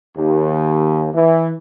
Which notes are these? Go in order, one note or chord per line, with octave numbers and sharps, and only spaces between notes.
D#2
E3